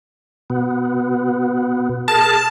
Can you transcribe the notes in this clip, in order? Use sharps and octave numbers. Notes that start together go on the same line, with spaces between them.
B2 B3
G#4 A#4 A5